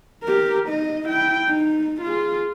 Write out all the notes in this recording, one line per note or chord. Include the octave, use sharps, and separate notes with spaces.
G4 A#4
D#4 D#5
E4 G5
D#4
F4 G#4